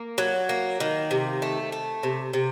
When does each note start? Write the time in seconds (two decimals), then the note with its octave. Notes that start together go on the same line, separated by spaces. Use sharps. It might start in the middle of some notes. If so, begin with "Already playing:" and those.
Already playing: A#3
0.18 F#3
0.49 A#3
0.80 D#3
1.11 C3
1.42 A3
1.72 A3
2.03 C3
2.34 C3